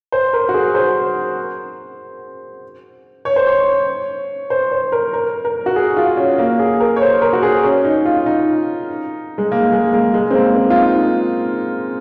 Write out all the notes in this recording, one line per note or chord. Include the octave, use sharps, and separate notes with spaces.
C5
A#4
F#4
G#4
C5
C#5
C5
C#5
C5
C5
A#4
A#4
A#4
F#4
G#4
F4
C#4
A#3
G#4
A#4
C#5
C5
A#4
F#4
G#4
C#4
D#4
F4
D#4
G#3
A#3
G#3
A#3
G#3
C4
A#3
C4
F4
D#4